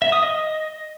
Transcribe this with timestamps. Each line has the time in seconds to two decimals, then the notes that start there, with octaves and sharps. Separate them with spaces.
0.02 E5
0.12 D#6
0.23 D#5